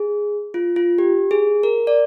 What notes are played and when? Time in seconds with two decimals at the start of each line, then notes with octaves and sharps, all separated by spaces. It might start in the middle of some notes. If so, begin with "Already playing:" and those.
Already playing: G#4
0.54 F4
0.76 F4
0.98 G4
1.31 G#4
1.63 A#4
1.87 D5